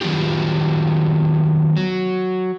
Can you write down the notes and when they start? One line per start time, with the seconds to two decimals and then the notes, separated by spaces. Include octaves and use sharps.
0.01 D#3 F#3 B3 F4 G4
1.77 F#3